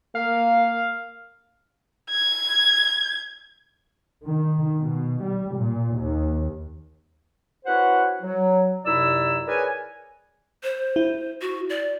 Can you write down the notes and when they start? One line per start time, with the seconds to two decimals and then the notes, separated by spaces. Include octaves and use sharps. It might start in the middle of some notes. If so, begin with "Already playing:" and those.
0.15 A#3 F5
2.10 G#6
4.26 D#3
4.81 B2
5.23 G3
5.57 A#2
5.98 D#2
7.66 C#4 E4 F#4 B4 C5 F#5
8.22 F#3
8.85 F#2 C3 D#4 E4 D5 E6
9.47 G#4 A#4 B4 C#5 D5 G#5
10.63 C5
10.96 E4
11.41 F#4
11.69 D5